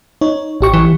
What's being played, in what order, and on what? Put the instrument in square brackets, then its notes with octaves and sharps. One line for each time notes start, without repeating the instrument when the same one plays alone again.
[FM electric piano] D#4 C#5
A1 G4 C#6
[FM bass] E3